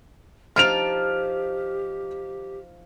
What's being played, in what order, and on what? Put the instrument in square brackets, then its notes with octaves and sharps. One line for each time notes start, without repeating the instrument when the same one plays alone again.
[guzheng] F3 D#4 A5 [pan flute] G4 [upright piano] F6 D7 F7